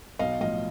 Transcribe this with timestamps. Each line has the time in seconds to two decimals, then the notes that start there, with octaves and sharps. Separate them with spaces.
0.19 B1 D#5 F5
0.41 A2 F3 D#5 F5